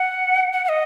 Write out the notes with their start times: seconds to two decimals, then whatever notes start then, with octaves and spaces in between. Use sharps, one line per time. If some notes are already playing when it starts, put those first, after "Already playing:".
Already playing: F#5
0.53 F#5
0.65 F#5
0.69 D#5